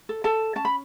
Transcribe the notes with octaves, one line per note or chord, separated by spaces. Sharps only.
A4
A4 A5
C#4 A5
B5